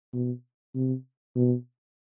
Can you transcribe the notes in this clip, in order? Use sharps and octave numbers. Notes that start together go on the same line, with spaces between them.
B2
C3
B2